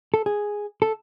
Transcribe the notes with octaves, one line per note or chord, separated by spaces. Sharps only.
A4
G#4
A4